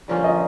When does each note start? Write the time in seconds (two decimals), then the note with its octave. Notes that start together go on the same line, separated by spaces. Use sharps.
0.08 D3 F3 A#3 C#4
0.24 D#5